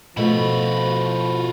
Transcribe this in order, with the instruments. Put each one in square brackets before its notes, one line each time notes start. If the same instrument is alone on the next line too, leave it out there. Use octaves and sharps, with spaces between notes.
[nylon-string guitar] B2 A3 [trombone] F3 [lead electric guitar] F4 F#4 [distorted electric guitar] B5